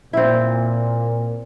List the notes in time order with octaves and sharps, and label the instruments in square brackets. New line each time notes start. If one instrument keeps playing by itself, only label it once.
[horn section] A#2 [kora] C4 E4